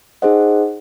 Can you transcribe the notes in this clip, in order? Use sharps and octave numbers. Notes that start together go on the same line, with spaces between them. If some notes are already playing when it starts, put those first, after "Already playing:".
D#4 G#4 C5 D#5 F#5